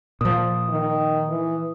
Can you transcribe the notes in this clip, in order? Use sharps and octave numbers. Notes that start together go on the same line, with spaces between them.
A#2 F3 D#6
D#3
E3